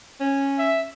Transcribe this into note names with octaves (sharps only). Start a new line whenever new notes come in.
C#4
E5